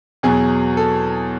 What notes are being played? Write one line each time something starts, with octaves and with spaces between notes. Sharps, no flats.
E2 B2 F#3 G#4
A4